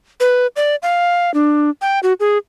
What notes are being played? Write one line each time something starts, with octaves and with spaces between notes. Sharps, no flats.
B4
D5
F5
D4
G5
F#4
G#4